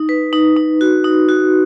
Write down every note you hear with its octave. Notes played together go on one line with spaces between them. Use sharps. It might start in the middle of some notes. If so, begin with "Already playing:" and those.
Already playing: D#4
B4
D#4
D#4
F#4
D#4
F#4